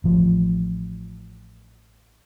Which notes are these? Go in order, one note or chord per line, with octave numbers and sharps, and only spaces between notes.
A1 F3